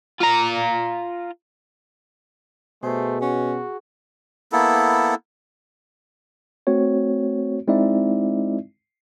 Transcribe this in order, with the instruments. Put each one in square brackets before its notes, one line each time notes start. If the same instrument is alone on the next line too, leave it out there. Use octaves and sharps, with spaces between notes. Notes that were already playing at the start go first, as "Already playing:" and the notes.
[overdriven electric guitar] F4 A#5
[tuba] B2 [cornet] A3 [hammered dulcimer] G#4 [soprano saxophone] C5
[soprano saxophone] C#4 [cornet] F#4
[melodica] A#3 B3 E4 A4
[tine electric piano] A3 C4 F#4 C#5
G#3 C4 D#4 E4 D5 E5